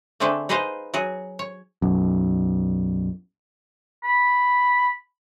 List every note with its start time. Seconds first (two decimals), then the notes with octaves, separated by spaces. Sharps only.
0.20 D3 A3 C4 D4 G#4 A4
0.49 D#4 G#4 B4 C5 D#5 F5
0.94 F#3 F#4 G#4
1.39 C#5
1.82 B1 F#2
4.04 B5